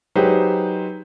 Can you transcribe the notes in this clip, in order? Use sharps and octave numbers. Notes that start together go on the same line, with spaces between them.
F#3 D#4 G4 G#4 B4 C5